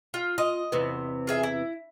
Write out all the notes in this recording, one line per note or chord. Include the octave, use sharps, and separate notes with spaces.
F4
F4 D#5
E2 C3 B3
F4 G#4 E5
E4